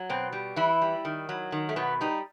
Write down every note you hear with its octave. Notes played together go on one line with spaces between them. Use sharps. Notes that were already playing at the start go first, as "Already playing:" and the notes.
Already playing: F#3
B2 C4
G3
E3 E4
G3
D#3
F#3
D#3
A3
B2 B3
G3 D#4